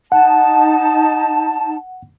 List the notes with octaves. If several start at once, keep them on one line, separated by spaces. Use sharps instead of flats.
D#4 F#5 A5